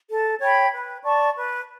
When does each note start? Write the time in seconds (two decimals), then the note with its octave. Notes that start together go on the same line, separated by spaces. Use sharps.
0.10 A4
0.42 C#5 G5 B5
0.74 B4
1.04 D5 A5 C#6
1.36 B4